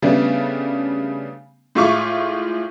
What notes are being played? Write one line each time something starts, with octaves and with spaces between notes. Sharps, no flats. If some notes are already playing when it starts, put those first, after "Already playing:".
C#3 G3 A3 B3 D4
A2 G#3 F4 E5 C#6 D6